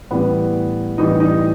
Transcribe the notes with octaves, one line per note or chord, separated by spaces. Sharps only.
A2 E3 G3 B3
A2 E3 G3 D#4
D#4